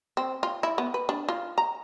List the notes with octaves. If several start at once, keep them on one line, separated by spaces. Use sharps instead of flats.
C4
F4
E4
B3
B4
D4
F4
A#5